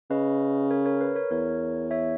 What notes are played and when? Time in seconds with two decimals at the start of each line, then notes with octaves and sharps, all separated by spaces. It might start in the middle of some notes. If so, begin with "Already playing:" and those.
0.10 C#3 B4 D#5
0.71 A#4 C#5
0.86 A#4 C#5
1.01 B4
1.15 A#4 C#5
1.31 E2 A#4 C#5
1.91 C#5 E5